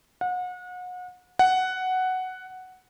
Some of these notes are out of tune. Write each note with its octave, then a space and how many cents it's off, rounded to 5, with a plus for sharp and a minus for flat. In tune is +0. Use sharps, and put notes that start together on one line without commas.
F#5 -35
F#5 +5